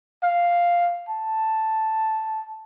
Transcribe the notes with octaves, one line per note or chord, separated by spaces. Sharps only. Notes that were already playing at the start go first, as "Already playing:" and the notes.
F5
A5